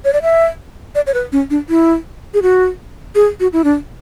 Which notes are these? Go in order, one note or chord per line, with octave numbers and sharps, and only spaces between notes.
C#5
D5
E5
D5
C#5
B4
C#4
D4
E4
G#4
F#4
G#4
F#4
E4
D4